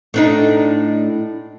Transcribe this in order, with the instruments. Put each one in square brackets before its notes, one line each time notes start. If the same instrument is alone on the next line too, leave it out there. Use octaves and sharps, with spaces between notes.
[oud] A2 D4 D#4